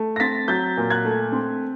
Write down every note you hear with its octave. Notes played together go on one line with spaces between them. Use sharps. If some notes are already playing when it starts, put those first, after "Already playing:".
Already playing: A3
A#6
C4 A6 B6
F#3 G6 A6
A#2
F#6 G#6
A3
C4